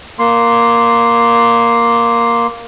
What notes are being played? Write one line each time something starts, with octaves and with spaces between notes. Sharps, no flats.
A#3 C6